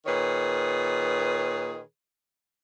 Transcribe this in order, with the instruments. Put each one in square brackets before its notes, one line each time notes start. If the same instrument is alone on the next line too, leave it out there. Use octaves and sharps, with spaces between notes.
[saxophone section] A#2 D#3 G#4 B4 C#5